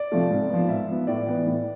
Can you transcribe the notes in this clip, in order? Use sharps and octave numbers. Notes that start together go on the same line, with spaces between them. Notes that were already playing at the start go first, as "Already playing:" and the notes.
Already playing: D5
C3 F3 A3
G#2
F3 B3
G#2 E5
F3 B3
A2 D5
E3 B3
A2